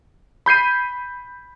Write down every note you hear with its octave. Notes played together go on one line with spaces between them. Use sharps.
B5 G6 C7 D#7